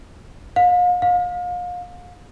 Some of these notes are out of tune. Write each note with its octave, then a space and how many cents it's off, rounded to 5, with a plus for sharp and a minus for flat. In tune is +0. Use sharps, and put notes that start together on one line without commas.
F5 +40
F5 +35